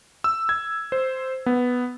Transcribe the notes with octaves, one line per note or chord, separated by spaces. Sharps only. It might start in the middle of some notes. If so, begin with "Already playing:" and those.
E6
G#6
C5
B3